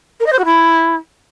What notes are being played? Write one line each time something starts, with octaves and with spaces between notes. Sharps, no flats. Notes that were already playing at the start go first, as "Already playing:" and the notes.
A#4
D#5
C5
F#4
E4